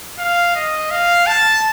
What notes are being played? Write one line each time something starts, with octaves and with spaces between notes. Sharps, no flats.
F5
D#5
F5
A5